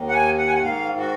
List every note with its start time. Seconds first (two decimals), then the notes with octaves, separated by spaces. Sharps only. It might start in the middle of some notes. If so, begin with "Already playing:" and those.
Already playing: D#2 D#3
0.08 F#5
0.13 G#5
0.38 F#5
0.47 G#5
0.55 F#5
0.61 G#2 D#3 F5
0.98 F#4